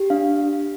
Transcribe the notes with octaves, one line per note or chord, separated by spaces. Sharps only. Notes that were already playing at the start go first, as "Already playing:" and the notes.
Already playing: G4
D4 F5